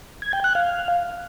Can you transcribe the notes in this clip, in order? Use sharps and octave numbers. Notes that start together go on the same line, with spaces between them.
G#6
G5
F#6
F5